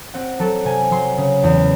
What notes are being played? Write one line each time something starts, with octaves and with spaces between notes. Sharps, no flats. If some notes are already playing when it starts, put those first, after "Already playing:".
C4 F#5
F#3 A4
C3 G#5
F#3 C6
C#3
E2